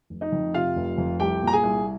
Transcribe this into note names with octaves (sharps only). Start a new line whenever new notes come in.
F1
D#4 D#5
F2
C3 F4 F5
F1
F2
C2 G4 G5
A#2
A#5
G#4 G#5
C2